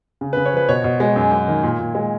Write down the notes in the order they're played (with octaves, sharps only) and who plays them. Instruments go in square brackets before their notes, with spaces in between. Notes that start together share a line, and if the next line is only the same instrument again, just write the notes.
[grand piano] C#3
C#3 B4
C#5
F3 B4
B2 C#5
B2
G#3
F#2
F#2
D#3
A#2
A#2
G#3